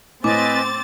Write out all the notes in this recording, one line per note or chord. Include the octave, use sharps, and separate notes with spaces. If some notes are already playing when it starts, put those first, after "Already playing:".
A2 C4 B4 D#5 G#5 D6 A6